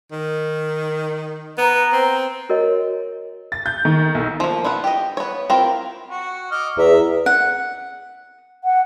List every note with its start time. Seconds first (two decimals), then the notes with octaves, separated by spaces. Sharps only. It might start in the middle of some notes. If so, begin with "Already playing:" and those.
0.12 D#3
1.58 B3 A#5
1.93 C4
2.49 F#4 A#4 C#5 D#5
3.52 A6
3.66 G6
3.85 D#3
4.15 B1
4.40 F3 A#3
4.64 B3 E4 F4 F#5
4.84 G4 D#5
5.17 B3 C#5
5.50 C4 E4 F4 G4 A#4
6.10 F#4
6.51 D#5 D6 F6
6.78 E2 E5 A#5
7.26 F#5
8.64 F#5